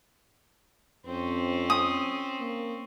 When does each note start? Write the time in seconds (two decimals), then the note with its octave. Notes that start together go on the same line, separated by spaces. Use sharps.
1.06 F2 C4 C#4
1.70 D#6
2.40 A#3